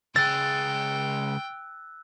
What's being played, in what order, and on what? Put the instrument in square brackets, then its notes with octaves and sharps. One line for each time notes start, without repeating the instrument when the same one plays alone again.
[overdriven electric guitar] C#2 G#3 [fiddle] G5 [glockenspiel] E6 F#6 [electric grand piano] A6